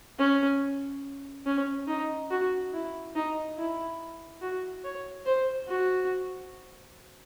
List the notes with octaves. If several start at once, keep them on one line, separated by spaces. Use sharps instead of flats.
C#4
C#4
D#4
F#4
E4
D#4
E4
F#4
C#5
C5
F#4